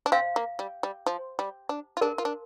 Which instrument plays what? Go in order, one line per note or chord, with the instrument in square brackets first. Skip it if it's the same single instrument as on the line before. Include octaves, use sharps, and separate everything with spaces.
[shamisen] D4
[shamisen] C4 [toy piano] F5
[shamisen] A#3
G3
G3
F3
G3
D4
F4
[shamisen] D4 [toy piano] A#4
[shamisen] F4
D4